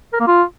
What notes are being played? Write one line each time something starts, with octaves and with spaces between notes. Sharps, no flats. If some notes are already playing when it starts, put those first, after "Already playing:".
A#4
A#3
F4